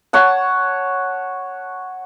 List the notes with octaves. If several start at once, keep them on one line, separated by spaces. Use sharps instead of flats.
C#5 F#5 A5